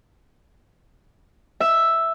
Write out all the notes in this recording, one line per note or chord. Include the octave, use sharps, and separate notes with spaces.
E5